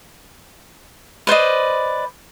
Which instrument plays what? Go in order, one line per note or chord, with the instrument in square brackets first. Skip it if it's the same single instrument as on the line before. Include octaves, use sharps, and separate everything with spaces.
[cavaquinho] B4 C5 D5 D#5